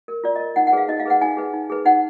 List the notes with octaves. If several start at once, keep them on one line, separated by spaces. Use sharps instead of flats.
A#4
F4 D5
D#5
A#4
D#4 F#5
F#5
G#4 B4 F5
D#4 D#5
F5
G#4 B4 F#5
D#4 G#5
G#4 B4
D#4
G#4 B4
D#4 F#5